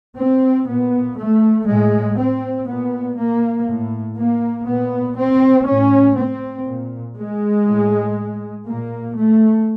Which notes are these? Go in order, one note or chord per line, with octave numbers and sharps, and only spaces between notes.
C4
A#2 B3
A3
A2 G#3
C4
A#2 B3
A#3
A2
A#3
A#2 B3
C4
A2 C#4
C4
A#2
G#3
A2
A#2 A#3
A3